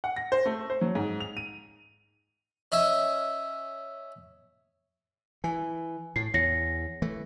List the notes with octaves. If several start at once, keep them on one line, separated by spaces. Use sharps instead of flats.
F#5
A#6
C5
A3
C5
F#3
G#2
F7
D#7
C#4 D#5 E5
E3 G#5
A2 C7
E2 C#5 A#6 C#7
E3 A3